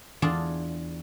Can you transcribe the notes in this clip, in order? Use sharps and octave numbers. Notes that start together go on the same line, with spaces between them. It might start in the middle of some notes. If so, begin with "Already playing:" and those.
E2 D4 F4 G#4 D5 A5